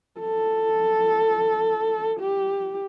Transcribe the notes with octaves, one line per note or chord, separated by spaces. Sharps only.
A4
G4